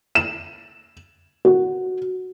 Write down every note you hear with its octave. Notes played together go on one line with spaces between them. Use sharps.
E7
F#4